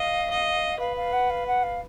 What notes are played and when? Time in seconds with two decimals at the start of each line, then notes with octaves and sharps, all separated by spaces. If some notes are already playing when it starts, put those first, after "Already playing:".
Already playing: D#5 F5
0.30 D#5
0.80 B4 F5
0.97 F5
1.13 F#5
1.30 F5
1.47 F#5
1.63 F5